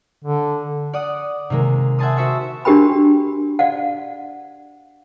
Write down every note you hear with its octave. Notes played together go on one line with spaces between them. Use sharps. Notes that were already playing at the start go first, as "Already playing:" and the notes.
D3
D5 F#5 D#6
C3 D#3 G#3 A#3
E5 F#5 G#5 A5 C6 D#6
F#4 C5 E5 C#6 E6
D4 F#4 G4 A#4 G5 B5
D5 F5 F#5